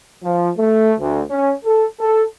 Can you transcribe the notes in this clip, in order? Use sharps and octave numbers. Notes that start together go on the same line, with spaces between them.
F3
A3
D2
C#4
A4
A4